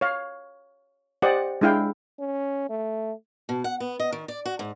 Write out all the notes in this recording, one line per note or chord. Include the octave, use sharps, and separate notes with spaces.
C#5 F5
G4 C5 D5 D#5 F#5
G#3 D4 E4 F5 G5
C#4
A3
B2
F#5
B3
D#5
D#3
D5
F#4
G#2